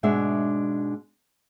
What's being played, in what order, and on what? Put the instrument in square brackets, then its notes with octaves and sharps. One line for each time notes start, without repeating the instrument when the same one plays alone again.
[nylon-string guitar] G#2 B2 G#3 D4 E5